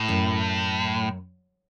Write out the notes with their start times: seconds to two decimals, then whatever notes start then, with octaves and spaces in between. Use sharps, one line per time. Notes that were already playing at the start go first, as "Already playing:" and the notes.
Already playing: A2
0.09 F#2